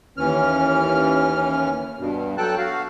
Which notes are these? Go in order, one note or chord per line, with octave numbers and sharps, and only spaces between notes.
D#2 E3 C#4 F6
G2 B2
F#3 A4 G5 A5 F#6
F#4 F5